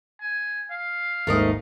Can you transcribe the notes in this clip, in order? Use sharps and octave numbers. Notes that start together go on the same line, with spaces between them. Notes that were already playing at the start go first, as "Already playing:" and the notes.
G#5
F5
G#1 D#2 G#2 A3 A#4 D#5